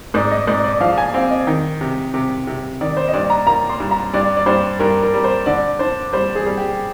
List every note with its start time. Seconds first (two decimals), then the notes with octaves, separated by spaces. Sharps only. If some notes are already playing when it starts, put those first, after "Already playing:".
0.14 G#2 D5
0.31 D#5
0.47 G#2 D5
0.64 D5
0.81 F3 F5
0.98 G#5
1.14 C4 F5
1.31 D#5
1.47 D#3
1.81 C3
2.14 C3
2.47 C3
2.81 D#3 D5
2.97 C5
3.08 D#5
3.13 G2 D5
3.30 A#5
3.47 A#3 A#5
3.69 C6
3.80 G2
3.91 A#5
4.14 G2 D5
4.37 D5
4.46 G2 C5
4.79 G2 A#4
5.03 A#4
5.14 G3
5.24 C5
5.46 D3 D5
5.79 D4 C5
6.13 G3 C5
6.35 G#4
6.46 G3
6.58 G4